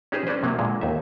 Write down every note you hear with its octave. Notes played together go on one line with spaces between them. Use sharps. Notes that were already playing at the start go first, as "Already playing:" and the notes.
C#4 D#4 G4 G#4 B4 C5
C#4 D4 B4 C5
C3 F#3 A#3
A#2 D3 G#3
D#2 D#4 E5